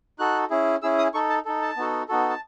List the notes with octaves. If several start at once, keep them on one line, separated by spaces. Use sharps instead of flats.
D#4 F#4 A4 F#6
C#4 E4 G#4
C#4 E4 G#4 E6
D#6
D#4 A4 C#6
A5
D#4 A4
A5
B3 D#4 F#4 A4
B3 D#4 F#4 A4
A5